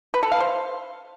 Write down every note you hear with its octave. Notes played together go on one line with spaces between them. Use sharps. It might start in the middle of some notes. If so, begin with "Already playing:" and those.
B4
A4
F5
C5